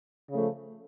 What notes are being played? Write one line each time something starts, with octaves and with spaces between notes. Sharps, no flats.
C#3 F3 A3